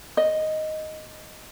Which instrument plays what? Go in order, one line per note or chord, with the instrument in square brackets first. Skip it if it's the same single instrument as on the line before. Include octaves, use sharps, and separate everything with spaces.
[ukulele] D#5